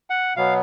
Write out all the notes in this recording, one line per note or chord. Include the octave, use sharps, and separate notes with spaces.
F#5
B2 F#3 B3 F5